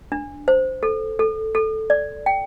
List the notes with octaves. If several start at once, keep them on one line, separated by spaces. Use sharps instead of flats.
D4
C5
A4
A4
A4
D5
G5